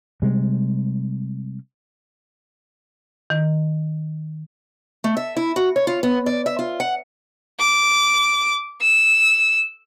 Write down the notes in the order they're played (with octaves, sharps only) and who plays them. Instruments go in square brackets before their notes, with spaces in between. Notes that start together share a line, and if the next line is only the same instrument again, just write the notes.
[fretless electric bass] C3 G3 G#3
[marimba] D#3
[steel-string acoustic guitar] A3
E5
E4
F#4
C#5
F4
B3
D5
E5
F4
F#5
[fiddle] D6
E6